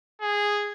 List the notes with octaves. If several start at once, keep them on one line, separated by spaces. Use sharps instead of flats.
G#4